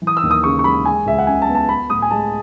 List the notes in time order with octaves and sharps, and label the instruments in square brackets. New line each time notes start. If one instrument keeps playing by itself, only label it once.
[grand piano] E3
D#6
E6
D#2
D#6
C#3 C#6
C#6
G#3 B5
G#3 G#5
C#2 E5
F#5
C#3 G#5
A5
B3
A5
B3 B5
A2 D#6
G#5
G#3 A5